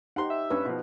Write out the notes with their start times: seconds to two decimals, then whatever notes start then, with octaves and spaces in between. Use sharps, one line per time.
0.16 D#4 G4 C5 F#5 A#5 C6
0.30 E5
0.50 G2 C#4 B4
0.65 B2 F3